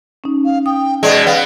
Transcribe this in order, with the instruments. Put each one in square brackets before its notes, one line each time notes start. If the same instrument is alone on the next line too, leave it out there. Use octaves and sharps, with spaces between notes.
[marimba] C#4 D#4
[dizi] F5
[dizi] G5 [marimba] D#6
[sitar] B2 G#3 [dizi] D5
[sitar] B3 [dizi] F5